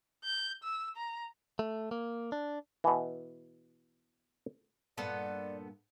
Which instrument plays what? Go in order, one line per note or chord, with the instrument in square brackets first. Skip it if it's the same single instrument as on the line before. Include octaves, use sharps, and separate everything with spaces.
[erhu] G6
E6
A#5
[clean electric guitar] A3
A#3
D4
[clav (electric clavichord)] B2 E3
[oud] G2 A#2 A#3 [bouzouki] B3 A4 C5 [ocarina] D5